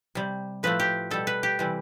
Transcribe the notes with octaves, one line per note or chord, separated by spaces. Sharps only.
C3 G3
A2 F3 A3 B4
G4
B2 G3 A4
B4
G4
C3 E3 G3